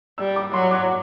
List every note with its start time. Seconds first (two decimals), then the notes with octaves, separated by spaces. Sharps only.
0.18 G3 E6
0.36 D6
0.53 F#3 C6
0.71 D6